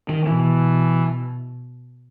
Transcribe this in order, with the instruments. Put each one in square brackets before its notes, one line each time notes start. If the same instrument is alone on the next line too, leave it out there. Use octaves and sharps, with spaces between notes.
[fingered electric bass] D#3
[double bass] B2 [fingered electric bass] E3